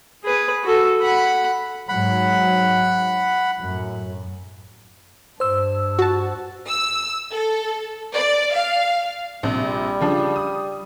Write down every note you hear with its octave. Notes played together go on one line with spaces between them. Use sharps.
G#4 B4
F#4 A4
F#5 B5
G#2 F#3 F#5 B5
F#2 A2
G2 C5 E6
F#4 A5
E6
A4
D5
F5
A#1 C3 G3
C#3 F3 D4
D#6